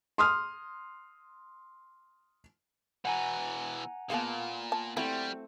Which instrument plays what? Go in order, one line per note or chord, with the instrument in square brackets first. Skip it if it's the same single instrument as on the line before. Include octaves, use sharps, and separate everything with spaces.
[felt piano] C6 D#6 F6
[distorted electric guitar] B2 E3 [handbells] F#5 G#5 A#5
[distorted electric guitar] A#2 [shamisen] G#3 A5 [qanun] A#3 B3 F5
[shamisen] A5
[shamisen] F#3 E4 F#4 [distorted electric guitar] G3 [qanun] A3 C4